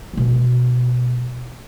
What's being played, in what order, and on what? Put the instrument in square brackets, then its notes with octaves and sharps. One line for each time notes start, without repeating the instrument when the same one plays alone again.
[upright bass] B2 A3